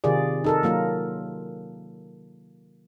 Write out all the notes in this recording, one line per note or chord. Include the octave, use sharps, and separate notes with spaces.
C3 D#3 F4 G#4 D5
D#4 A4 A#4
F#3 A#3 F4 A#4